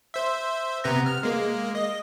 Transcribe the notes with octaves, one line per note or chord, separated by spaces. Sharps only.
C5 E5
C3 B3 A#5
F6
G#3 A#3
D#5